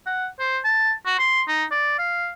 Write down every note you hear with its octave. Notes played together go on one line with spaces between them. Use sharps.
F#5
C5
A5
F#4
C6
D#4
D5
F5